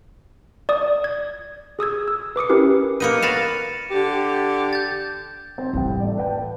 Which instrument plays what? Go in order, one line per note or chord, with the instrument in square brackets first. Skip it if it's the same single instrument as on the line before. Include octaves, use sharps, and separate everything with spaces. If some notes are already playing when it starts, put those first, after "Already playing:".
[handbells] D5 D#6
G#6
G#4 D#6 E6 G#6
E6
B4 D6 D#6 C#7
C#4 E4 G4 A#4 B4
[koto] A#3 B3 D#4 [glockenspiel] C#7 D#7
[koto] B4 C#5 F5 [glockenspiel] A6 A#6 E7
[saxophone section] D3 G4
[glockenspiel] G6 A6
[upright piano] C4
[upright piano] C2 G5 [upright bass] A2 E3
[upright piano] A3 D5
B4 G5 A5